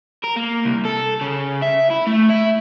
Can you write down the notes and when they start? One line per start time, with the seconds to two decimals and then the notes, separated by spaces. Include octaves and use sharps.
0.24 A#4
0.37 A#3
0.65 C2
0.85 A4
1.21 C#3
1.62 E5
1.91 E4
2.07 A3
2.30 E4